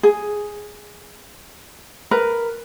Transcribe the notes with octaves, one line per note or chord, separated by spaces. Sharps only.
G#4
A#4 B4